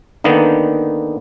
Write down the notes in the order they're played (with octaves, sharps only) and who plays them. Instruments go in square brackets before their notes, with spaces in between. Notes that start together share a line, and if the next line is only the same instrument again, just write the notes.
[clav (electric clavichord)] D3 D#3 A#3 B3 D#4